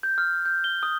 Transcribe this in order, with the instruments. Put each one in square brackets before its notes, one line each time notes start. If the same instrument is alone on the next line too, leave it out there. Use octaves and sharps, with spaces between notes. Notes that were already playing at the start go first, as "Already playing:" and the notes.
[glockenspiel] G6
F6
G6
G7
D#6